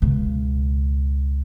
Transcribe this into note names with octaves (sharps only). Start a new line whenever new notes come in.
C#2 B2